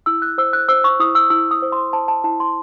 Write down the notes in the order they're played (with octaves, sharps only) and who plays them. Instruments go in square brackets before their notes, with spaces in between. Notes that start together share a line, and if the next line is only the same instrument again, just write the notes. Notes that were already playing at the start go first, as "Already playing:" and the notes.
[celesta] E4 E6
F#6
C5 E6
F#6
C5 E6
C#6
E4 D#6
E6
E4 E6
D#6
C5
C6
C5 A5
A5
E4 A5
C6